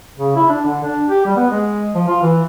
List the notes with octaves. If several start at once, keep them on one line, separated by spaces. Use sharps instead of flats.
C#3
E4
D4
D3
D4
G4
G3
B3
G#3
F3
F4
E3